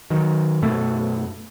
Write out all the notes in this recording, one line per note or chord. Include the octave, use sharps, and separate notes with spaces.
D#3 F#3
F#2 B2 A3